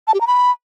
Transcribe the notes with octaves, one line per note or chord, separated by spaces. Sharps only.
A5
G4
A#5
B5